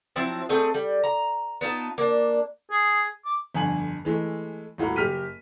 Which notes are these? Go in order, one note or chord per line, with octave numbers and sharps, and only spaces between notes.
F3 F#3 C4 E4
A3 C4 G#4 D#5
G3
A#5
B3 D#4 F4 A5
A#3 D4
G#4
D6
G1 F2 D3 G#5 F#7
E3 G#3 A3
D#1 A2 F4 F#4 A#5
F#1 G4 F6 B6 D#7